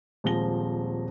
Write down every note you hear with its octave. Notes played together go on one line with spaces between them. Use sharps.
D#1 F3 G#3 C4 A#6 G7